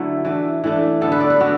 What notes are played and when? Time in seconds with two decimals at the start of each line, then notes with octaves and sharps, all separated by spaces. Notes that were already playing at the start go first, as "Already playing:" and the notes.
Already playing: D3 F#3 A3 E4
0.25 E3 A3 D4
0.64 E3 A3 D4
1.01 D3 B3 D4 A4
1.12 B4
1.21 D5
1.30 B4
1.40 D3 B3 D4 F#4